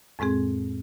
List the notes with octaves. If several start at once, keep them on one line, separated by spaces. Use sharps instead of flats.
F2 A2 G#3 C4 G#4